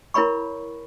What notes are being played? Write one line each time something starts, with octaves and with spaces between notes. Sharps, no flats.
E4 A#4 C#5 B5 C#6